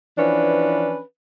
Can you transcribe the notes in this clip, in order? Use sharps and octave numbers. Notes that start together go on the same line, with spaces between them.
E3 F3 C#4 D4 B4